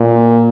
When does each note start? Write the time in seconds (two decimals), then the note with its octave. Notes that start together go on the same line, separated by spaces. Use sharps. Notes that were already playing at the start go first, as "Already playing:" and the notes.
Already playing: A#2